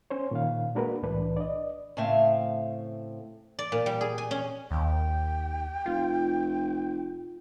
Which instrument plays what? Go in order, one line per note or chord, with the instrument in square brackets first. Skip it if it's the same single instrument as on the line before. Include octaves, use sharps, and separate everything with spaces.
[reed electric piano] C#4 C5 C#5
A#2 D#3 F5
G#3 A#3 D4 F#4 A#4 B4
C2 A2 E3 D4 B4
D5 D#5
[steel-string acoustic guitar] A2 C#3 A3 C4 E5 F5
[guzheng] D5
A#2
G3
G#4
G#5
C#4
[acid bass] D#2 [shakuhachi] G5
[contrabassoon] F1 [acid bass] F4